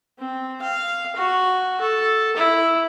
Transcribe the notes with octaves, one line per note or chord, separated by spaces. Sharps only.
C4
F5
F#4
A4
E4